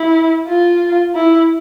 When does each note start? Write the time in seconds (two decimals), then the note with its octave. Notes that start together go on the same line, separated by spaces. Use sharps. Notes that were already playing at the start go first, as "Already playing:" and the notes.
Already playing: E4
0.48 F4
1.15 E4